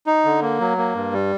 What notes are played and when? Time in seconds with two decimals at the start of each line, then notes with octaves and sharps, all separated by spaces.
0.06 D#4
0.25 D3
0.42 A#3
0.60 F#3
0.78 A#3
0.95 G2
1.13 G3